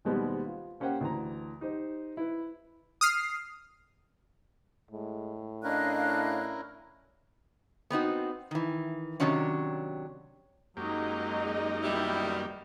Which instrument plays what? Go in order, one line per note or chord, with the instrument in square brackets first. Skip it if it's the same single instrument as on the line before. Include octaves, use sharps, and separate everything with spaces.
[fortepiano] D#2 B2 G3 G#3 B3 C4
F4
A#3 C#4 G4 C5 F#5 G5
D2 E3 A#5
D#4 G4 C5
E4 B4
[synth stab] D#6 F6 C7
[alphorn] A2 [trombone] G#3
[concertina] C#4 E4 A#4 [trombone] D4 [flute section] D#5 F5 F#6
[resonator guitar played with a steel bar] B3 C4 D#4 F#4
D#3 E3
C3 D#3 F#3 C#4 D4
[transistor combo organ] F#2 A#3 G4 [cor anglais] F#3 [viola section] G#3 D#4 D#5
[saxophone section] B2 D#3 G3 [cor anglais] E4